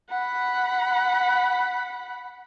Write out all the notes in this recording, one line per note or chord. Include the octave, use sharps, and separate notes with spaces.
F#5 B5